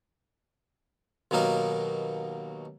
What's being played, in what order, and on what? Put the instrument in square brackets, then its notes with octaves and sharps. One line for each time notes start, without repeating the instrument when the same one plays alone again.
[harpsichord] D#2 B2 F#3 A#3 D#4